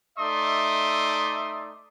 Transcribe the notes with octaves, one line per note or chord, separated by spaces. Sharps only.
A3 D#4 D5 E5 C6 D#6